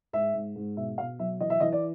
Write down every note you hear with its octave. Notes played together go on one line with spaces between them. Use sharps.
G#2 E5
G#2
G#2
B2 E5
B2 F5
F#3 E5
E3 D#5
E5
E3 D#5
D5